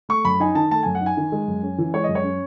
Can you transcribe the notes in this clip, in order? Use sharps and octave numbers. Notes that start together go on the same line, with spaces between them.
A3 C#6
F#2 B5
D#4 G#5
D#3 A5
A3 A5
F#2 G#5
F#5
D#4
G#5
D#3
G#3
F#2
C#4
E3
G#3 C#5
F#2 D#5
C#5
C#4